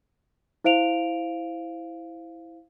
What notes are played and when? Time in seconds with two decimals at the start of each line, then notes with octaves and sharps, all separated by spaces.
0.64 E4 C5 F5 D7 F7